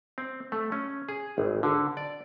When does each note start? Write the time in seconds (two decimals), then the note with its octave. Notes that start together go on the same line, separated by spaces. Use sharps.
0.18 C4
0.52 A3
0.72 C#4
1.09 G#4
1.38 G#1
1.63 D3
1.97 D5